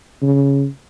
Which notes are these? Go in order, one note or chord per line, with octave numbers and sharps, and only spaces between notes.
C#3